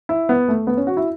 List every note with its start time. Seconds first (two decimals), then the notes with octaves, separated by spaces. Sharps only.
0.09 E4
0.29 B3
0.48 A3
0.67 B3
0.77 C#4
0.87 F#4
0.97 E4